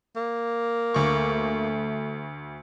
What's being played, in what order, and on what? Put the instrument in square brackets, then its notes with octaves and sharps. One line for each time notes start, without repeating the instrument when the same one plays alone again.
[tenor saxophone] A#3
[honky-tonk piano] D2 C#6 [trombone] A3